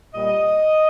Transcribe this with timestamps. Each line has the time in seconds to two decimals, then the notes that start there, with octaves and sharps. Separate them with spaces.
0.13 A#2 G3 D#5